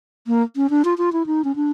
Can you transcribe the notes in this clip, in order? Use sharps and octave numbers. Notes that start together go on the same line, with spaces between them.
A#3
C#4
D4
F4
F4
E4
D#4
C#4
D4